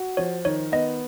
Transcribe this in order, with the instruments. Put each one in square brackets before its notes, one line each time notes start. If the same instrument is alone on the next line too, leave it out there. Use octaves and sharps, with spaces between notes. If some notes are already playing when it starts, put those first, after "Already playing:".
Already playing: [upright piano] F#4
[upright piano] F3 [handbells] C#5
[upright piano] D#3 [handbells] C#5
[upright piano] B3 [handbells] D#5